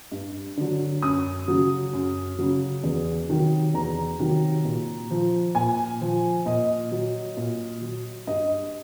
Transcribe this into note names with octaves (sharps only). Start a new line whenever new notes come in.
G2
D3 F#3
F#2 D#6
C#3 F#3
F#2
C#3 F#3
E2
C3 D#3 F#3
E2 A#5
C3 D#3 F#3
A#2
F3
A#2 G#5
F3
A#2 D#5
F#3
A#2
F#3
G2 D#5